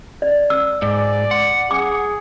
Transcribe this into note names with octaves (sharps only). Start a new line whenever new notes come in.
D5
E6
G#2 D5
F#5 C6
G#4 D6